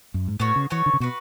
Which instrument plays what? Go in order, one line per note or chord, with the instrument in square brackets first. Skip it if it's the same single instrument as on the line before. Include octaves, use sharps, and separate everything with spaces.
[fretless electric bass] F#2
G#2
[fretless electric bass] A2 [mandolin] B3 F#4 C#5
[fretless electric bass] C#3
[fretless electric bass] E3 [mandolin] B3 F#4 C#5
[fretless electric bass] D3
C#3
[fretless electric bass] B2 [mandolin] F#4 B4